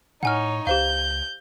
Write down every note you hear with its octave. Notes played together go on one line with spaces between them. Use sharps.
A2 D#4 C#5 F#5 G#5 F6
C#2 G4 C5 F5 G6